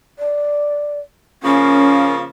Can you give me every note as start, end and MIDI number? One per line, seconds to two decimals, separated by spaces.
0.19 1.00 74
1.43 2.25 49
1.43 2.25 53
1.43 2.25 58
1.43 2.14 61